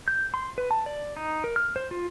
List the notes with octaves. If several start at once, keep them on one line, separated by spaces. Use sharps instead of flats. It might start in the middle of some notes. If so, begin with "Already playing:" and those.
G6
C6
B4
A5
D5
D#4
A#4
F6
C5
F4